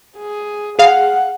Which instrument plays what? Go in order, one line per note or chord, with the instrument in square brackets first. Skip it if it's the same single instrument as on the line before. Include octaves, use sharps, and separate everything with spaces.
[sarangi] G#4
[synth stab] G#4 F5 [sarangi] F#5